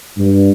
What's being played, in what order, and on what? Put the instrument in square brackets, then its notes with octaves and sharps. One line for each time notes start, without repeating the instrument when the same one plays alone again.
[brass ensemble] G2